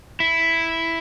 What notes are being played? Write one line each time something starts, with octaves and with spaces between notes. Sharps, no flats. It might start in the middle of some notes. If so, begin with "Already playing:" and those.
E4